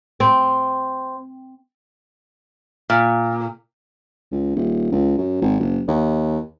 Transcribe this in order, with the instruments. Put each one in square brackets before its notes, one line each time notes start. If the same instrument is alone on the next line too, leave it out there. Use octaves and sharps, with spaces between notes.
[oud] C4
[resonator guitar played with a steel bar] A#2
[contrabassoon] C#2
D#1
C#2
F#2
G#1
F#1
D#2